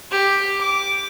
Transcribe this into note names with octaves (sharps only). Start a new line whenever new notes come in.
G4
D6